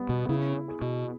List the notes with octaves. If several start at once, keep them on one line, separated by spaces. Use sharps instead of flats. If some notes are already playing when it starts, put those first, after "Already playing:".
Already playing: G3 B3
B2
C#3 E4
G#4
B2